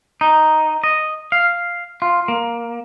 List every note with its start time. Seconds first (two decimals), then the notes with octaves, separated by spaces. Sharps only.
0.21 D#4
0.84 D#5
1.32 F5
2.02 F4
2.28 A#3